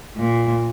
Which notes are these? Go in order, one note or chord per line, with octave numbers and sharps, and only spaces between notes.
A#2